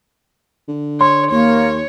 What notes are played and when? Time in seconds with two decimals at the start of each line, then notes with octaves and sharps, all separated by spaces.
0.68 D3
1.01 C#5 C6
1.31 D#2 A#3 C#5